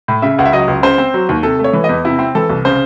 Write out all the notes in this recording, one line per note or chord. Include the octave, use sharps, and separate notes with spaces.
A2
C#3 E5
C#2 F#5
E5
F#3 D#5
C#2
C#3 C5
C4
F#3
D#2
C3 A4
A3
C#5
E3
D#5
E2
C3 E4
C4
E3 A4
C2
C#3 C5